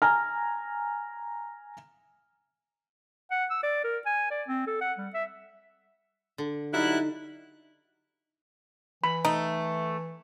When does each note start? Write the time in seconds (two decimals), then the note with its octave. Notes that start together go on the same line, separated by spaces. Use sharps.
0.02 G#5 A#5 F6
3.31 F#5
3.50 E6
3.63 D5
3.84 A#4
4.06 G#5
4.31 D5
4.48 C4
4.67 A4
4.81 F#5
4.98 G3
5.14 E5
6.38 D3
6.73 F#3 G3 D#4 E4 F#6
9.04 E3 B5
9.25 A3 D#4